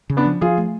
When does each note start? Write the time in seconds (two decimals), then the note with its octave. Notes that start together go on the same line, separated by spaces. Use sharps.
0.10 C#3
0.17 B3 D4
0.25 F3
0.41 F3 F4 G#4
0.58 A3